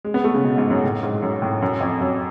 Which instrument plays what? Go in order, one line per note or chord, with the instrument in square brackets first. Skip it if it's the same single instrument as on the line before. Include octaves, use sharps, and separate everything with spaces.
[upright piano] G#3
B3
A3
C#3
B2
G#2
F#2
A2
G#2
F#2
A2
F#2
F2
F#2